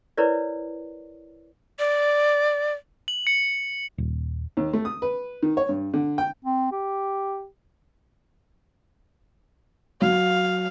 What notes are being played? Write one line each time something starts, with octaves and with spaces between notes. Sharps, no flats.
E4 A#4 B4 C#5 D5
D5
F#7
C#7
D#1
D#2
A3
D#6
B4
D#3
C#5
G2
D3
G5
C4
G4
F#3 F5